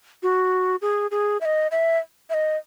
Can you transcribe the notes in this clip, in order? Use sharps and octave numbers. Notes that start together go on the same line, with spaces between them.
F#4
G#4
G#4
E5
D#5
E5
E5
D#5